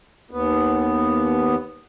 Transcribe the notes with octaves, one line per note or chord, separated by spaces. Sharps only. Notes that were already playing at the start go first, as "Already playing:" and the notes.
D#2 B3